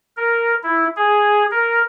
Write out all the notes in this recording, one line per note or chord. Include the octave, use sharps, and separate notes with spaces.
A#4
E4
G#4
A#4